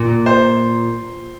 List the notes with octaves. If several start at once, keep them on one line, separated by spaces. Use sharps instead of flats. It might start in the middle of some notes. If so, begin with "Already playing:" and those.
Already playing: A#2
C5